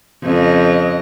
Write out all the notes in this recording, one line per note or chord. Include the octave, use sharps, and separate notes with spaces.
F2 C#3 D#5